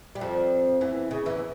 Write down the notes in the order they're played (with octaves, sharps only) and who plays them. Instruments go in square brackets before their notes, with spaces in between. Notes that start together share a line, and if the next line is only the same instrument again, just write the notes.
[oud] G3
F2 F3
E2 E3
C#3
E2 E3